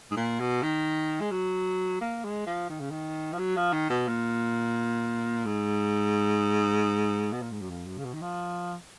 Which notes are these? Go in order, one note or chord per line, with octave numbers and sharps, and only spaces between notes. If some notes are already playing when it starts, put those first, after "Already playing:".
G#2
A#2
B2
D#3
G#3
F#3
A#3
G#3
F3
D#3
C#3
D#3
F3
F#3
F3
D#3
B2
A#2
G#2
B2
A#2
G#2
F#2
F2
F#2
C#3
B2
D#3
F3